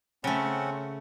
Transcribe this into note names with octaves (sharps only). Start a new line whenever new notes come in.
C#3 A3 C4 C#4 F#5